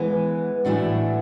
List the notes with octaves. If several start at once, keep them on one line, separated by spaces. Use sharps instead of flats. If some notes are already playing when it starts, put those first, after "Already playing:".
Already playing: E3 G#3 B3
A2 E3 A3 D4 F#4